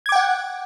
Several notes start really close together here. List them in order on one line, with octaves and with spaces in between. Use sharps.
G#6 D6 G5 F#5